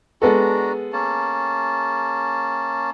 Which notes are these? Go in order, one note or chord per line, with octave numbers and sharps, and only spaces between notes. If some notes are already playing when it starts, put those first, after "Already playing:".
G#3 B3 D4 F#4 A4 A#5
A#3 C#4 A5